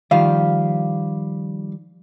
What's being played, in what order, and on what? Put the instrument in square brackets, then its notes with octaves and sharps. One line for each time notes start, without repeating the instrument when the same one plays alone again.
[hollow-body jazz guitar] D#3 F3 G3 [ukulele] F5